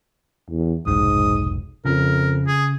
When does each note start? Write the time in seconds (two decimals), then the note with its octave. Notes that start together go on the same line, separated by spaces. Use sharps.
0.50 E2
0.87 F1 B1 G#2 D#6
1.85 F2 C#3 A#4
2.47 G#4